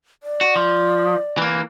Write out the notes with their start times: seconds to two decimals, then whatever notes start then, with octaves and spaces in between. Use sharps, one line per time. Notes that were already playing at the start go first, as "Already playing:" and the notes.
0.23 D5
0.41 F#4
0.56 F3
1.37 E3 A#3